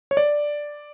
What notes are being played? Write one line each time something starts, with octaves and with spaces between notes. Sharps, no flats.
C#5
D5